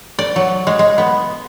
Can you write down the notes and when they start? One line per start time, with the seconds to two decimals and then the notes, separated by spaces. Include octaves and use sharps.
0.19 D5
0.36 F#3
0.67 G#3
0.79 G#3
0.98 B3